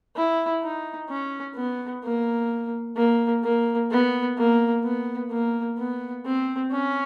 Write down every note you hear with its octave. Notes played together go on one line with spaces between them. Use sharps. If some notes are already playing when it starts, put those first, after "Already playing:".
E4
D#4
C#4
B3
A#3
A#3
A#3
B3
A#3
B3
A#3
B3
C4
C#4